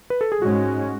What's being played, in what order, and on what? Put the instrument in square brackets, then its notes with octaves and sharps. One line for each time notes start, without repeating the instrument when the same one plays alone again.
[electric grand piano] B4
A4
G#4
[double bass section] G#2 G#3 C#4 [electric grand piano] F#4